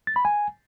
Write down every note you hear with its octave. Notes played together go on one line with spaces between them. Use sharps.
A6
B5
G#5